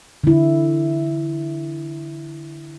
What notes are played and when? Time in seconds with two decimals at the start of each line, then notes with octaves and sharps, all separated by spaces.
0.24 D3 E4